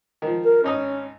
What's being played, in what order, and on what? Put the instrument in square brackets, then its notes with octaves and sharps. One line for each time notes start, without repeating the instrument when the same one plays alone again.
[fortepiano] D#3 F3
[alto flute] A#4
[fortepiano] G#1 D#4 D#6 [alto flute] C#4